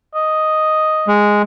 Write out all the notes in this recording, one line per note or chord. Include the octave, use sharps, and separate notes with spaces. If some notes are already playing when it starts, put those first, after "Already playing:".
D#5
G#3